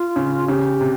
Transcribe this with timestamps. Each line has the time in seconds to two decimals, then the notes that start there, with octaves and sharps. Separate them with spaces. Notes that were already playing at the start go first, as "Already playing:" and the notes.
Already playing: F4
0.16 C#3
0.48 C#3 G4
0.81 C3